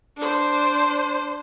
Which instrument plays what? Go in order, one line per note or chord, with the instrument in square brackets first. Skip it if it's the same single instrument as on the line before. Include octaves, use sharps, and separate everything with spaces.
[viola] D4 C5